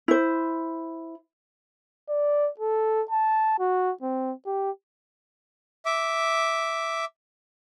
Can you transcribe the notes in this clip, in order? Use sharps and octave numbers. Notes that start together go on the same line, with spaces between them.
E4 C5
D5
A4
A5
F#4
C4
G4
E5 D6